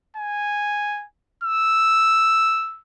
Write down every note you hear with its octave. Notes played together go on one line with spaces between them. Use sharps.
G#5
E6